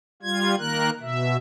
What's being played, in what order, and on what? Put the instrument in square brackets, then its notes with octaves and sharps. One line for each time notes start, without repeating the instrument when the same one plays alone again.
[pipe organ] G3 F4 G#6
D#3 A#3 A#4 F#6
B2 E5